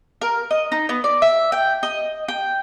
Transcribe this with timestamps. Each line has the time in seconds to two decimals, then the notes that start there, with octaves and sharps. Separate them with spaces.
0.21 A#4
0.51 D#5
0.72 D#4
0.89 B3
1.04 D5
1.22 E5
1.52 G5
1.83 D#5
2.28 G5